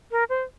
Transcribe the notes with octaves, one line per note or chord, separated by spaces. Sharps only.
A#4
C5